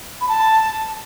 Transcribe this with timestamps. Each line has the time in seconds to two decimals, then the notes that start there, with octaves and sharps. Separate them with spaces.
0.21 B5
0.29 A5